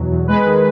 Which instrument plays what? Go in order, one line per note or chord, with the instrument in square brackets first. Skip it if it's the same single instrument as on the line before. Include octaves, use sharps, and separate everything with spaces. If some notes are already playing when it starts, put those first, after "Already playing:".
Already playing: [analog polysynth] E2 B2 F#3
E2
G#3 B4
D#3